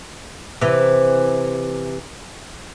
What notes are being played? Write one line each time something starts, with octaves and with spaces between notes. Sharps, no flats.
C3 E3